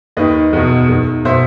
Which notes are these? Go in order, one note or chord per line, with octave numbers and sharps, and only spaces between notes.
D#2 D#3 B4 D#5
E2 B2
E2 D#3
B2 C5 E5